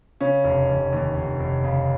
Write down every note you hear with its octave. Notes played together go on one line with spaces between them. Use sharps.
C#3 C#4
F1
F1
D#2
F1
F1
C#3